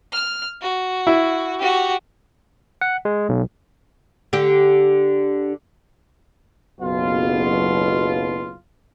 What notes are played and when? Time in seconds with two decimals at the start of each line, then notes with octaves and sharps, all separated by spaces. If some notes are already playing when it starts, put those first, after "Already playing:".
0.12 F6
0.62 F#4
1.07 E4
1.59 F#4 G4
2.81 F#5
3.05 G#3
3.29 B1
4.33 D3 G4
6.80 F#1 B1 B2 F4